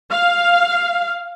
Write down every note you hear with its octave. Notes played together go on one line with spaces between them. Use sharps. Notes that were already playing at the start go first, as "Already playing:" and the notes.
F5